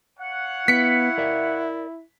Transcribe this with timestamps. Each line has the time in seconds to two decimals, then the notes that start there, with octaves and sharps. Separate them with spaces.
0.19 C#5 F5 F#5
0.68 B3 E4 B6 C#7
1.18 A#4 D5 E5